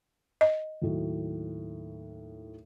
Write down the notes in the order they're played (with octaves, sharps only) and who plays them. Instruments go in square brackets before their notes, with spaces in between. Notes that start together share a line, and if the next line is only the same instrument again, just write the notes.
[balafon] D#5
[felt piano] D#2 A2 F#3